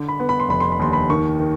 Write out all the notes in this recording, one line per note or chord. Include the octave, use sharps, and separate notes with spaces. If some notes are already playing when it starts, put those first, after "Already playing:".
Already playing: D3
B5
B3
B5
C6
F1 B5
C6
B5
D#2 C6
B5
D#3 C#6
D#3